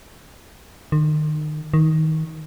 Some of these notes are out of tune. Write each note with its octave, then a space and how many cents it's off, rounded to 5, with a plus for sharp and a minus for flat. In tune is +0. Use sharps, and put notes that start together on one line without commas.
D#3 -35
D#3 +20